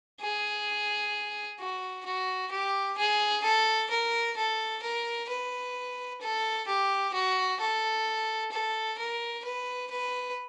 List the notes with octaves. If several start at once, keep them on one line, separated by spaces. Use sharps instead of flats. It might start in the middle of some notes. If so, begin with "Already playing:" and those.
G#4
F#4
F#4
G4
G#4
A4
A#4
A4
A#4
B4
A4
G4
F#4
A4
A4
A#4
B4
B4